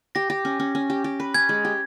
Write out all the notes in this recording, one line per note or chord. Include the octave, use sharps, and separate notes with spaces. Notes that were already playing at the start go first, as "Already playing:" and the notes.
G4 A#6
G4
C#4
C#4
C#4
G4
G4
B4
C#4 G#6
G#3
G4